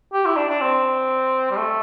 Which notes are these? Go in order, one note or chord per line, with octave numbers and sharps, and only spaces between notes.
G4
E4
D4
D4
C4
G3
A3